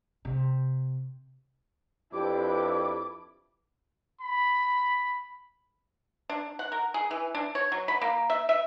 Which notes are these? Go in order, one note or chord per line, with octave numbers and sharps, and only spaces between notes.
C3
F2 D4 E4 G4 A4 B4 D6
B5
D4
F#5
A#4
G#4
E3
D4
C#5
F#3
B5
A#3
E5
E5